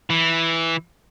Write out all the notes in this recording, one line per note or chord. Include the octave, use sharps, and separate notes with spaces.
E3